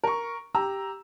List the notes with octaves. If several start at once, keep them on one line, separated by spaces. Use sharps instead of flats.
A#4 C#6
G4 A#5 E6